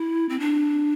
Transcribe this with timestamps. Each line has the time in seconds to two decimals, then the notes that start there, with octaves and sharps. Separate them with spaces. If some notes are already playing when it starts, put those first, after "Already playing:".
Already playing: E4
0.29 C4
0.40 D4